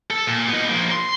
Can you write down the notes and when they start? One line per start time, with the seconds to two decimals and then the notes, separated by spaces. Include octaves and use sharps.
0.10 A4
0.27 A#2
0.49 B3 D#4
0.69 F3 A#3
0.92 C6